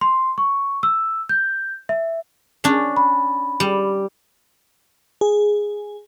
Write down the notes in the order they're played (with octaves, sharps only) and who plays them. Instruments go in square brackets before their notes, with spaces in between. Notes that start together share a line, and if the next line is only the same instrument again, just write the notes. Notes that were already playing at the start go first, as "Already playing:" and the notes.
[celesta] C6
C#6
E6
G6
E5
[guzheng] C#4 D4
[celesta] B5
[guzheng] G3
[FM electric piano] G#4